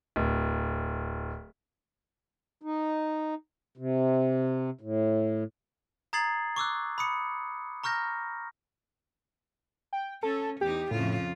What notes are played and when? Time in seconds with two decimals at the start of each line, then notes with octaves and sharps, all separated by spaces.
0.16 D1
2.62 D#4
3.77 C3
4.81 A2
6.13 A#5 D#6 G#6 A6 C7 F#7
6.56 C#6 D6 E6 F#6
6.98 B5 D#6 C#7
7.84 A#5 C#6 F6 G6 A#6
9.93 G5
10.23 C#4 A4
10.61 E2 D#4 G4
10.91 F2 A2 C#3 F4